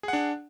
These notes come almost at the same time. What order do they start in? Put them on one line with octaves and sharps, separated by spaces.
G#4 F#5 D4